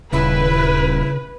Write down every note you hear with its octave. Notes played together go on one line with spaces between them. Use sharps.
D#1 C#3 E4 B4